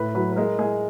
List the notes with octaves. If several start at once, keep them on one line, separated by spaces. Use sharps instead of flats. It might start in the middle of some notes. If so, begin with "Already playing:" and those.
Already playing: A2 B4
F#3 B4
B4
G#3 A#4
G#3 G#4